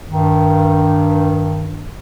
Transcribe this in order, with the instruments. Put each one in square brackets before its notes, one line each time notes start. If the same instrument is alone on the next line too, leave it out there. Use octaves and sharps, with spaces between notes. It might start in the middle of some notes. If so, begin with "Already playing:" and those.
[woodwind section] G2 D#3